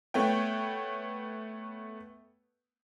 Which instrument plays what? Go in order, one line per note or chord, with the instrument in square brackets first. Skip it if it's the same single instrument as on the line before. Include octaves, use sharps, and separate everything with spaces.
[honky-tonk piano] A3 B3 C#5 G5